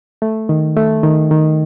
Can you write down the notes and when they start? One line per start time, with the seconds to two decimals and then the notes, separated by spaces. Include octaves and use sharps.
0.22 A3
0.49 D#3
0.76 A3
1.03 D#3
1.31 D#3